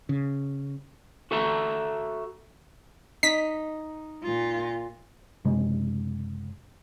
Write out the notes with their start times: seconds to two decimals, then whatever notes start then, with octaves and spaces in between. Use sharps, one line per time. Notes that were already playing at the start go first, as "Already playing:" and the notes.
0.09 C#3
1.31 F#4 A4 E5 A#5
3.23 D#4 B6
4.23 A#2 F4
5.45 F#1 C3 G#3